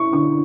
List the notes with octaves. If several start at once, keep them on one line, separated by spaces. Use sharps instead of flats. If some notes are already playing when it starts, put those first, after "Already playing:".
Already playing: E4 C#6
D3 C#6